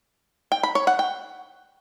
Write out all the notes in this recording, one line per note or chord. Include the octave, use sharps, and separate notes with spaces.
G5
B5
C#5
F#5
G5